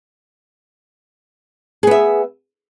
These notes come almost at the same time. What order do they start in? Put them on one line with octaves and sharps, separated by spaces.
G#4 B3 E5